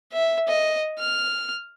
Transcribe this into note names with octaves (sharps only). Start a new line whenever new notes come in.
E5
D#5
F6